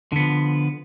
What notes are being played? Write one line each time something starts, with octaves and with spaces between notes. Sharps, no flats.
D3 F3 B3